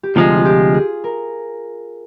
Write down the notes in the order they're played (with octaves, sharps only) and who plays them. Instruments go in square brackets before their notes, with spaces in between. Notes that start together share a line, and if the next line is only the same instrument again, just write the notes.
[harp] G4
[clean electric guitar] D2 C3 F3 G#3 [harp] F4
[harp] F4
G4
G#4
A#4